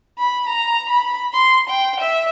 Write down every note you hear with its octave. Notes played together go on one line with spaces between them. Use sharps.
B5
A#5
B5
C6
G5
E5